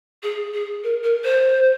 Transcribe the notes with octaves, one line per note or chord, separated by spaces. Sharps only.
G#4
G#4
A#4
A#4
C5